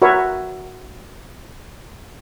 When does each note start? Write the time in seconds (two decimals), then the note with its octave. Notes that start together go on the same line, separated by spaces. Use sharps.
0.02 F#4 A#4 B4 C#5 E5